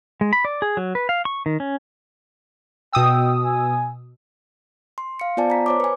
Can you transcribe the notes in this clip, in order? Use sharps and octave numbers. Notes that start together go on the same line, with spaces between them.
G#3
B5
D5
G#4
F#3
B4
F5
C#6
D#3
C#4
B2 G5 D#6 E6
G#5
C6
F5 C#7
B3 F4 C5 D5 G#5 A5
A#5 B6
C5 C#5 D6
B4 G#5